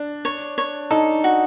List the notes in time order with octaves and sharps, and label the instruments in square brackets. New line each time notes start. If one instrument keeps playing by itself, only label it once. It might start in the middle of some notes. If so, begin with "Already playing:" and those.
Already playing: [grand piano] D4
[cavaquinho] C#5
C#5
[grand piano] D#4 [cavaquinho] A4
[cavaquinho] F#4